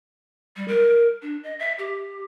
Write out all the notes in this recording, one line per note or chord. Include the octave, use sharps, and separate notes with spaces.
G3
A#4
D4
D#5
E5
G4